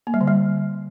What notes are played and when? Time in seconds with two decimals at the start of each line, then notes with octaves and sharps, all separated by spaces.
0.07 A#3
0.14 G3
0.21 D3
0.28 G3